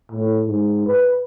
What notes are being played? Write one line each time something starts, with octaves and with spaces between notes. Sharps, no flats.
A2
G#2
B4